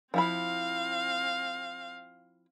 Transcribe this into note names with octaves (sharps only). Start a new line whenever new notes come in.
F3 C4 E4 F5 B5